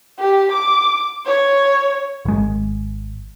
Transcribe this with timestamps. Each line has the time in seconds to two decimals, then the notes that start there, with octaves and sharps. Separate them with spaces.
0.19 G4
0.52 D6
1.26 C#5
2.25 G#1 G#3